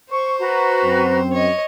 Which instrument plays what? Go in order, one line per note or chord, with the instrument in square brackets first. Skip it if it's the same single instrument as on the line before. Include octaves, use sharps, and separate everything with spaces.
[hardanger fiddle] C5 [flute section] C#6
[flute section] F#4 B4 A#5
[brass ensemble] F#2 C4
[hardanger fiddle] C#5 D#5